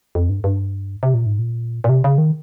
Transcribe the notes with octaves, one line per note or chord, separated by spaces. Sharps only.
F2
G2
G2
C3
A#2
G#2
A#2
A#2
C3
C#3
D#3